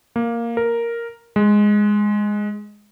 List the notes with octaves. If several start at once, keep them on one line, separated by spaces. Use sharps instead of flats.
A#3
A#4
G#3